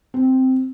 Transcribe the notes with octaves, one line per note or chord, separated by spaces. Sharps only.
C4